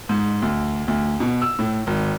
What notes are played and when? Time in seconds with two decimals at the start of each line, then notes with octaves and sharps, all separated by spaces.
0.09 G#2
0.42 D2
0.88 D2
1.20 B2
1.42 E6
1.59 A2
1.87 G#1